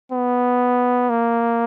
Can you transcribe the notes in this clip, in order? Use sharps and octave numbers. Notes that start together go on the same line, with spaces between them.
B3
A#3